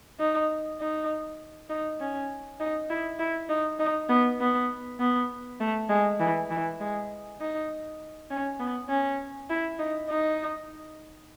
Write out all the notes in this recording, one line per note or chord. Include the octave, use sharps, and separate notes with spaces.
D#4
D#4
D#4
C#4
D#4
E4
E4
D#4
D#4
B3
B3
B3
A3
G#3
E3
E3
G#3
D#4
C#4
B3
C#4
E4
D#4
D#4